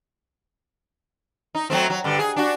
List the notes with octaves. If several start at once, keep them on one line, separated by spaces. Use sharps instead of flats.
D#4
F#3 A3 C4
F#3
G2 D3
G#4
D4 F#4